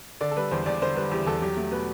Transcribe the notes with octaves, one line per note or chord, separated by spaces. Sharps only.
D3 D5
A4
G3 B4
E2 C5
E2 D5
D3 C5
G3 B4
E2 G4
E2 A4
F#3 G4
A3
B2 B4